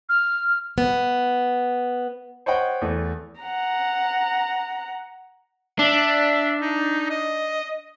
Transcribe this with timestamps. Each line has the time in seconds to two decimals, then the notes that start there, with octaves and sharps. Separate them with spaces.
0.09 F6
0.78 B3
2.46 C5 C#5 D#5 F#5 G5
2.81 E2 A3
3.41 F#5 A#5
5.79 D4 E5
6.61 D#4
7.10 D#5